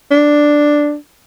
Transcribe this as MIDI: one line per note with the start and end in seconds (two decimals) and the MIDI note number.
0.11 0.95 62